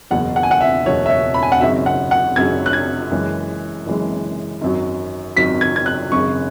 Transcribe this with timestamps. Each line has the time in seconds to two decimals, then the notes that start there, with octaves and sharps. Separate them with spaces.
0.11 F#1 E2 B2 F#5
0.36 F#5
0.43 G#5
0.51 F#5
0.61 E5
0.86 F#1 E2 B2 C#5
1.06 E5
1.10 C#5
1.34 B5
1.43 G#5
1.52 F#5
1.60 G#1 F#2 C#3 F#3 E5
1.86 F#5
2.11 F#5
2.36 G#1 F#2 C#3 F#3 G#6
2.66 F#6
2.73 G#6
3.11 F#1 F#2 E3 G#3
3.86 F#1 F#2 E3 G#3
4.61 G#1 F#2 F#3
5.36 G#1 F#2 F#3 B6
5.61 G#6
5.76 G#6
5.86 F#6
6.12 G#1 F#2 C#3 C#6